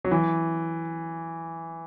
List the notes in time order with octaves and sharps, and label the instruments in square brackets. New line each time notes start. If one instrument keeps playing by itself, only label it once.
[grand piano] F#3
E3